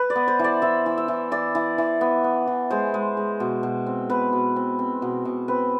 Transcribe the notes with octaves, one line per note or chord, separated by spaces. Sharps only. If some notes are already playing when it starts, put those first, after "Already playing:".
Already playing: B4
D5
B3
C5
E3 D5
E3 E5
E3
E5
E3
E3 D5
E3
E3
B3
B3
E3
G#3 C5
G#3
G#3
B2
B2
C4
B2 B4
B2
C4
C4
B2
B2
C4 B4